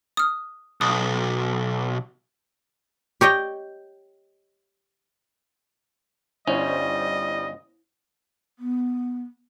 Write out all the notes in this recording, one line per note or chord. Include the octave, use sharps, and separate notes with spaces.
D#6 F6
B1 D#6
G4 C#5 D#5 G5
G1 G3 C#4 E4 C5 D#5
B3